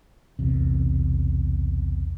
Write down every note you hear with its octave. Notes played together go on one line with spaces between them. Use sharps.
B1 E2 C3